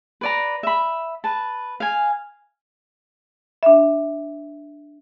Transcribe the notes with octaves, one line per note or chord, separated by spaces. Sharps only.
B4 D5 A#5
E5 B5
B4 A5
F5 G#5
D4 E5